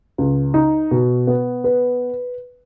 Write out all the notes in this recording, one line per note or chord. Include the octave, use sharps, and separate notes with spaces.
C#2
D#4
B2
B3
B4